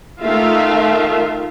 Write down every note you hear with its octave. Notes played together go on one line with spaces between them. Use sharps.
D#3 A3 F4 E5 F5